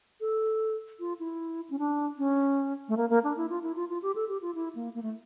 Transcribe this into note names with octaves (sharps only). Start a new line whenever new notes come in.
A4
F4
E4
C#4
D4
C#4
A3
A#3
A#3
D4
E4
F4
E4
F4
F4
G4
A4
G4
F4
E4
A#3
A#3
A3